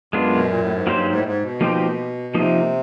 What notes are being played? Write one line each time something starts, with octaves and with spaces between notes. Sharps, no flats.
F#2 G#3 B3 D4 F4
B2
A#2
A2
G#2
G2 F#3 A#3 D#4 G4 C5
G#2
A2
G#2
B2
F3 A#3 D#4 G4 C5
C3 F3 A#3 D#4